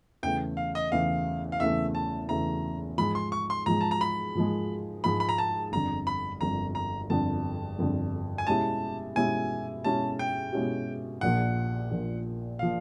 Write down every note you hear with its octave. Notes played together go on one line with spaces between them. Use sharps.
E2 C#3 E3 A3 G5
F5
D#5
E2 C#3 E3 A3 F5
F5
E2 C#3 E3 A3 E5
A5
E2 C#3 E3 A3 A#5
G#2 F3 G#3 B5
C6
C#6
C6
G#2 F3 G#3 A#5
A5
A#5
B5
G#2 F3 G#3
G#2 F3 G#3 B5
B5
A#5
A5
G1 F2 D3 A#5
B5
G1 F2 D3 A#5
A#5
G1 F2 D3 A5
G1 F2 D3
G#5
B2 G#3 C#4 E4 G4 A5
B2 G#3 C#4 E4 G4 G#5
B2 G#3 C#4 E4 G4 A5
G5
B2 G#3 C#4 E4 G4
A#1 A#2 F3 F#5
A#1 A#2 F3
A#2 F3 F5